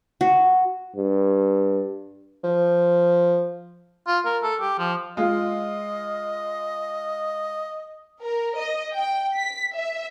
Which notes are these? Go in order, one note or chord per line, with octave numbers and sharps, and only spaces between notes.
F#4
G2
F3
F4
A#4
A4
G4
F3
G#3 F4 D#5
A#4
D#5
G5
B6
E5